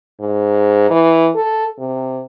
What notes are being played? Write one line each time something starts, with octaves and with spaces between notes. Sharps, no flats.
G#2
E3
A4
C3